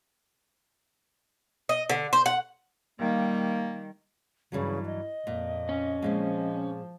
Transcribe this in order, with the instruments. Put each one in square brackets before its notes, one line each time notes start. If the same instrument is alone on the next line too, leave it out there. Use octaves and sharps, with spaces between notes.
[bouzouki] D#5
D3
C5
F#5
[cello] D#3 G3 [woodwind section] A#3
[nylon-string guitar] G2 E3 F#3 [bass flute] C#3
[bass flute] D#5
[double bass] F2 [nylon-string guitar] A#2
[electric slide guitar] C#4
[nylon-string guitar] A#2 G#3 C4 [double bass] F3